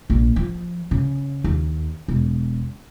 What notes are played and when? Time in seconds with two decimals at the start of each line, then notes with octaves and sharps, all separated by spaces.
0.10 A#1
0.36 F3
0.91 C#3
1.44 D#2
2.08 E1